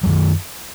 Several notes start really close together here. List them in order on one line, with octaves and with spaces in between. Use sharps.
F#3 F#2 D#3